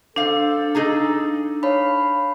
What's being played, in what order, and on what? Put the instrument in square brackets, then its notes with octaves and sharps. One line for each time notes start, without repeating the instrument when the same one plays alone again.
[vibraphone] D4 [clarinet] A4 [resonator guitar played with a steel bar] C5 F5
[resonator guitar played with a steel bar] D#4 G#4 A#5
[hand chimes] C#5 A5 B5 [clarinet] F5